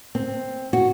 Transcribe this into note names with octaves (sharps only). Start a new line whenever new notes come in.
C4
F#4